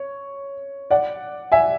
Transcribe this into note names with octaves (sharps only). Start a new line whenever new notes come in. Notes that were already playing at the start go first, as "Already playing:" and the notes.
Already playing: C#5
D5 F#5
E5 G#5